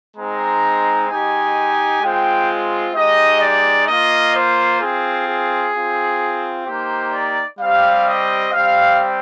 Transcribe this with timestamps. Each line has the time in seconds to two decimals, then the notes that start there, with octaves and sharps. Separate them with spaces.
0.16 G#3 C4 D#4 A#5
1.09 G#3 D#4 G4 G#5
2.01 G#3 C4 F4 G5
2.95 G#3 D#4 G4 D#5
3.41 D5
3.87 A#3 F4 D#5
4.34 C5
4.81 C4 F4 G#4
5.27 G#4
5.74 C4 F4
6.66 A#3 D#4 G4 C5
7.14 D5
7.59 G3 C4 G4 F5
8.06 D#5
8.53 G3 C4 G4 F5